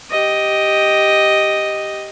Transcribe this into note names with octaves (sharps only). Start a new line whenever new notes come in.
G4 D#5